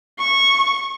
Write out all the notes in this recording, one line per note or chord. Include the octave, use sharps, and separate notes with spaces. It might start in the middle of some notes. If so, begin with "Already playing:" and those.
C#6